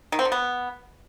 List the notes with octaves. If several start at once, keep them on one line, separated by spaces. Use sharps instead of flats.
D#3
C4
D3
B3